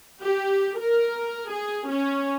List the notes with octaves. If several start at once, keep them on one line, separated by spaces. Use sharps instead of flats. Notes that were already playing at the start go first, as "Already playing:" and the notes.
G4
A#4
G#4
C#4